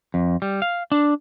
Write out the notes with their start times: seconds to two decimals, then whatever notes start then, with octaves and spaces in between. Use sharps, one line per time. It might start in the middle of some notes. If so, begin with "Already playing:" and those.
0.14 F2
0.42 G3
0.62 F5
0.92 D4